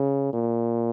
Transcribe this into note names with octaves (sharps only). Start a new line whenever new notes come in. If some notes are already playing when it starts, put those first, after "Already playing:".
Already playing: C#3
A#2